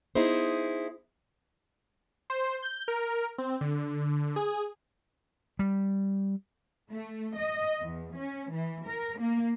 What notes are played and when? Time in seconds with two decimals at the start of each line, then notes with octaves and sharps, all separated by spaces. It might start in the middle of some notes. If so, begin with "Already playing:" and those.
0.15 B3 D#4 E4 G#4 C5
2.30 C5
2.62 G6
2.88 A#4
3.38 C4
3.61 D3
4.36 G#4
5.59 G3
6.91 A3
7.37 D#5
7.82 E2
8.15 C#4
8.52 E3
8.86 A#4
9.19 A#3